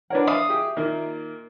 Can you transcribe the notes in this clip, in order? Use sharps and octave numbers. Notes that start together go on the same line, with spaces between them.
D4 A#4 B4 C#5 F#5
E5 F5 D#6
G4 G#4
A#2 D#3 A#3